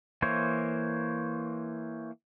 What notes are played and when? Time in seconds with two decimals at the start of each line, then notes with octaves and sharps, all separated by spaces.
0.22 E3 A#3 C5 C#5